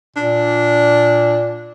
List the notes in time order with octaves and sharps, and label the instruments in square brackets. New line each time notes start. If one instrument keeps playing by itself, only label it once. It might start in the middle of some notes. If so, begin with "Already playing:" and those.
[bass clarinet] A#2 [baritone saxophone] D4